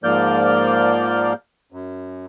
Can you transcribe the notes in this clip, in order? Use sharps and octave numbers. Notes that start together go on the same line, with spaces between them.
G#2 F3 A#3 D5 F6 G6
F#2